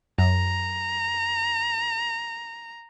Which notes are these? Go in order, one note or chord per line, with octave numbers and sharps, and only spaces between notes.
F#2 A#5